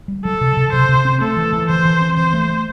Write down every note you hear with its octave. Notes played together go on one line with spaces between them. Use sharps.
G3
F#3 A4
C3
C3
C3 C5
C3
C4
A3 A4
E3
E3
E3 C5
E3
C4
E3 C5
A3
A3